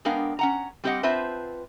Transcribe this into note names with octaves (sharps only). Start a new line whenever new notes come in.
G#3 B3 D4 A#4 F5 G5
C#4 F#5 A#5
G3 C4 G4 C5 D#5 F#5
C4 F4 B4 C5 E5 A5